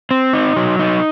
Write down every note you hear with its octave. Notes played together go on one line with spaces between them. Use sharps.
C4
D#4
F#3
D#4